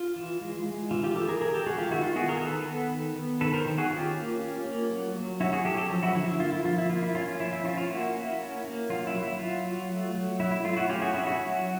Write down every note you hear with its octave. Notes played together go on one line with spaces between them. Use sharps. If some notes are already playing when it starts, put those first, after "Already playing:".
Already playing: F4
E3
G#3
G#3
E3 F4
F4 G4
E3 G4 A4
G#4 A#4
E3 G#4 A#4
G4 A4
G#3 F#4 G#4
F4 G4
D#3 E4 F#4
F4
B3 F#4 G#4
G#4 A#4
D#3 A4 B4
B3
D#3
B3
D#3 A4 B4
A#4 C5
D#3
F#4 G#4
C#4 F4 G4
A#3
C#4
A#3
F#3
F#3
C#4 E4 F#4
F#4 G#4
F#3 G4 A4
G4 A4
F3
E4 F#4
D3 E4
E4
A#3 F4
E4
F3 F4
E4
A#3 F4
E4
C#4 F4
F4
F3 E4
E4
C#4 F4
F4
A#3 E4 F#4
A#3
C#4
A#3
F#3 F4
E4
F#3
E4
F#3 F4
F#3
A3
F#3
F#3 E4
E4
A3 F4
E4 F#4
C#4 F4 G4
F#4 G#4
C#4 E4 F#4
E4 F#4
F#3
F#3